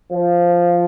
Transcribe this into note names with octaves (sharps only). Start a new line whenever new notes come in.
F3